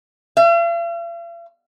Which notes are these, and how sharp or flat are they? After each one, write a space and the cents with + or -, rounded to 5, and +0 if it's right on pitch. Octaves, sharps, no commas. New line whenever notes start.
F5 -45